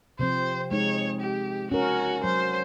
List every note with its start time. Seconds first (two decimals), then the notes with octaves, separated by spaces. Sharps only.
0.19 C3 F3 C4 C5
0.71 G#3 D#4 C#5
1.21 G4
1.71 C#4 F#4 A#4
2.24 F#3 C5